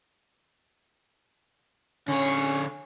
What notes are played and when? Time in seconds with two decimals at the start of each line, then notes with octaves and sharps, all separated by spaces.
2.08 D3 C#4 C#5